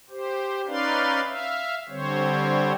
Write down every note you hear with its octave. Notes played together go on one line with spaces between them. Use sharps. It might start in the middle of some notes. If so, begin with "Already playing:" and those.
G4 C5
C#4 D#4 B4 D5 F5 C6
E5 F5
D3 G3 C4 C5 C#5